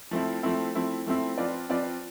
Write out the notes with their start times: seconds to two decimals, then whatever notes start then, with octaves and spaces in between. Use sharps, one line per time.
0.11 F3 A3 C4 E4
0.43 F3 A3 C4 E4
0.75 F3 A3 C4 E4
1.06 F3 A3 C4 E4
1.38 F3 C4 F4 B4 D5
1.69 F3 C4 F4 B4 D5